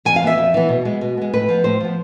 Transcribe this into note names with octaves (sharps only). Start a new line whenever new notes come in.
F2 G#5
F5
E3 B3 E5
F2
E3 B3
B2
G#3 B3
B2
G#3 B3
A2 B4
F3 B3
A2 C5
F3 B3